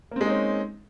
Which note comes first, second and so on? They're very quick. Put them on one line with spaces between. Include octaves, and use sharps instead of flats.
A#3 C4 G#3 D#4 C#4